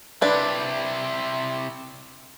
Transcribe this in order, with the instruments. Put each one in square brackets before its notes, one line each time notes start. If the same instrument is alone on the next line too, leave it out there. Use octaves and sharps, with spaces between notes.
[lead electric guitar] C3 E4 [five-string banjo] D4 B4